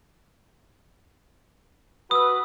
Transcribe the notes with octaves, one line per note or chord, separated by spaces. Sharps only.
F#4 B4 D#6 E6